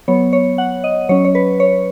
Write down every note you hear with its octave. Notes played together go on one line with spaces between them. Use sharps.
F#3 B3 C#5
C#5
F#5
D#5
F#3 C#4 C#5
C#5
B4
C#5